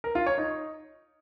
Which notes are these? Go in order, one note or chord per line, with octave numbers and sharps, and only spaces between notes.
A#4
F4
C#5
D#4